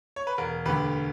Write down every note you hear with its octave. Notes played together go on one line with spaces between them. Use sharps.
C#5
B4
E1 A#4
D2 D3 G4 B4